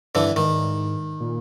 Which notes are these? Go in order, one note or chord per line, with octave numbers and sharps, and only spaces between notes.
G2 D3 E3
G#2 D#3
A#2